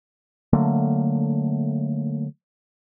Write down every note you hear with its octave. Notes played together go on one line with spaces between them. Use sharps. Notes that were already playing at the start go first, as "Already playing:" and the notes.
D3 F#3 A3 A#3